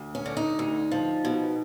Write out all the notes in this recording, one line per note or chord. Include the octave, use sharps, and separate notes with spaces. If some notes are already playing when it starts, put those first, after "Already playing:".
Already playing: D2
C#4
D3
D#4
D2
F3
B2